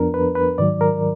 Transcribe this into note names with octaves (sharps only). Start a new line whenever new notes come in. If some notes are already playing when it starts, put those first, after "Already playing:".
Already playing: F2 F3 B3 D4 A#4
B4
B4
G#2 D#3 F#3 D5
A#4